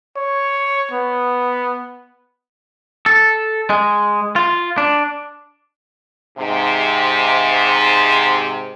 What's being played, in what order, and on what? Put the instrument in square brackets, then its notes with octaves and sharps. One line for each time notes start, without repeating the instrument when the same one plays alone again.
[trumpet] C#5
B3
[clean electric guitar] A4
G#3
F4
D4
[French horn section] G#2 C3